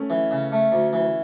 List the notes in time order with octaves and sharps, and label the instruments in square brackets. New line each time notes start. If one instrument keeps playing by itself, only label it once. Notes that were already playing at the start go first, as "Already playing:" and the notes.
Already playing: [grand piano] A3 C#4
[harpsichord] E3
C#3
A3
D2
E3